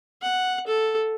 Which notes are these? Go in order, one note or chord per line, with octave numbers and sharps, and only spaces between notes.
F#5
A4